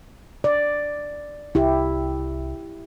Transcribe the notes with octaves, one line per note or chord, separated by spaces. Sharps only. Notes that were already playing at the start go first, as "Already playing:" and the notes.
D5
C2 E4 G4